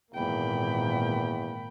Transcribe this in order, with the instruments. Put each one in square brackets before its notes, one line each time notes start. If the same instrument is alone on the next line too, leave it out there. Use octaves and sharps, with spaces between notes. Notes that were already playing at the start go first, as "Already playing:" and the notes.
[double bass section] G#1 A#2 A#3 [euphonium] E2 [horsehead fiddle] G5 B5